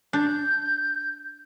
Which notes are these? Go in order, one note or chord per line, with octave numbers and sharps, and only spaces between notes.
D4 G6